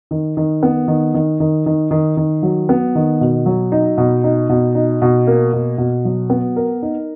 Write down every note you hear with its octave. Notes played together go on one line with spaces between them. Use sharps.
D#3
D#3
B3
D#3
D#3
D#3
D#3
D#3
D#3
F#3
B3
D#3
B2
F#3
D#4
B2
D#4
B2
D#4
B2
A#3
B2
B2
F#3
B3
A#4
D#4